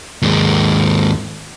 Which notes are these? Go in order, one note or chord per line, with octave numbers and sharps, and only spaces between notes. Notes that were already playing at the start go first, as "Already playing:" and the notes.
D#2 G#2